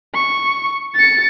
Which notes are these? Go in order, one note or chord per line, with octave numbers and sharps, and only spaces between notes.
C#6
A6 C#7